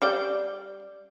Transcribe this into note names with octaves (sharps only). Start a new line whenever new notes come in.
G3 D5 G5